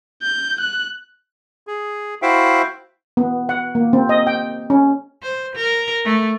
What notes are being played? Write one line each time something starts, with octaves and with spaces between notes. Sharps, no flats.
G6
F#6
G#4
E4 F#4 C5 E5 F5 G5
B3
F#5
A#3
C4
D#5
G5
C#4
C5
A#4
A3